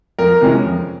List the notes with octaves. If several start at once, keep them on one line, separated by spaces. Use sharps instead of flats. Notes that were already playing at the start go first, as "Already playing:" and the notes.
F2 A#4
C3 E3 G#3 C#4
F2